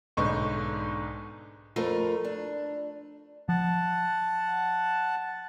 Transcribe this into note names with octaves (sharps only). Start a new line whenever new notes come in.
B1 G#2 D3 D#4 B4 C#6
F2 A3 F4 A#4 B4
D4
F3 F#5 A5